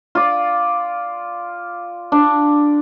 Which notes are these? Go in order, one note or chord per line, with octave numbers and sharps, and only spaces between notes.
F4 D5
D4